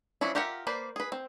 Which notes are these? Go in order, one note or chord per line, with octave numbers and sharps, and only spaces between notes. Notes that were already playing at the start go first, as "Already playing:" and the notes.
F3 F#3 C#4 D4 E4
F4 G4 A#4 E5 F#5
A#3 B4 C5 D5
G#4 B4
C4